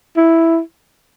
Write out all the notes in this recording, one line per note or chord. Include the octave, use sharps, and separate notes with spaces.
E4